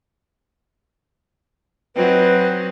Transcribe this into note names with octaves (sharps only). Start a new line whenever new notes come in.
F#3 C4 D#4 B4